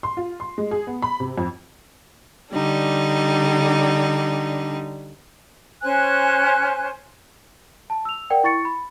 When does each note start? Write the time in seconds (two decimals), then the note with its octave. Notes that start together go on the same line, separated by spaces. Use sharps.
0.03 C6
0.17 F4
0.40 C6
0.58 G#3
0.71 G#4
0.87 B3
1.02 B5
1.20 C3
1.38 F2
2.52 D3 G3 D4 D#4
5.83 C#4 C5 G#5 F#6
7.90 A5
8.05 E6 F7
8.30 A#4 D5 F#5 G5
8.44 E4 C#6 A6 C#7
8.65 B5